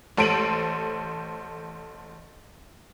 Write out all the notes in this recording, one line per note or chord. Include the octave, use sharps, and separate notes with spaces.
A1 A4 C5 D7 D#7 F#7